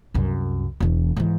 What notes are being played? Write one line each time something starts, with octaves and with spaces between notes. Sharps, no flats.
C2 F#2
E1 E2
G#2 E3